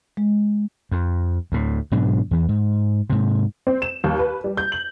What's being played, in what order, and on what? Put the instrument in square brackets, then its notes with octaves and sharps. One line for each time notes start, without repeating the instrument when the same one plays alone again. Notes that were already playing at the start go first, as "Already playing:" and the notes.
[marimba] G#3
[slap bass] F2
D2 A2
G#2 B2 F#3 D4
E2 E3
G#2
G#2 C3
[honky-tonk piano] C4
E7
D#2
B4
G3
G6
F#7